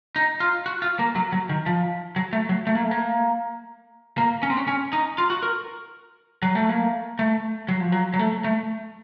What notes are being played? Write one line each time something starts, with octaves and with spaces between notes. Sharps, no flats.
D#4
F4
F#4
F4
A#3
F#3
F#3
D#3
F3
F#3
A3
F#3
A3
A#3
A3
A#3
A#3
C#4
C4
C#4
C#4
D#4
F4
F#4
A#4
F#3
A3
A#3
A3
F#3
F3
F#3
F#3
A3
A3